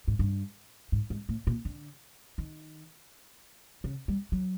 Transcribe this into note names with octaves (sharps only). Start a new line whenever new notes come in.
G#2
G2
G#2
G#2
A2
A#2
D3
D#3
C#3
G3
F#3